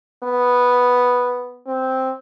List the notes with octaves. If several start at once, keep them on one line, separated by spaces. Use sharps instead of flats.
B3
C4